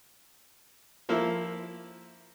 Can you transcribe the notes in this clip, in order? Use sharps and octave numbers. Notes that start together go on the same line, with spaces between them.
F3 A#3 E4